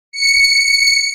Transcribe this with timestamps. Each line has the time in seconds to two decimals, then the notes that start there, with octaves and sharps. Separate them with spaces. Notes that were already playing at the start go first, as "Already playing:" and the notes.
0.12 C#7